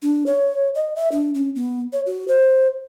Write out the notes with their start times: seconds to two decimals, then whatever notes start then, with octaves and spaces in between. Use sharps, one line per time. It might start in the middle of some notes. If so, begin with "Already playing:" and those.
0.02 D4
0.26 C#5
0.75 D#5
0.96 E5
1.12 D4
1.35 C#4
1.55 B3
1.93 C#5
2.06 F#4
2.28 C5